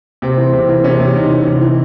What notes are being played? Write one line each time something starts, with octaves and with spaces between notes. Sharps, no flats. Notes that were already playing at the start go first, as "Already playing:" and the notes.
C3 C4
E3
C3 C4
E3
C3 C#4
C3
C3 D#4
E3
C3
E3